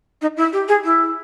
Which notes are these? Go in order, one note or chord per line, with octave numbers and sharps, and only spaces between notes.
D#4
E4
G4
G#4
E4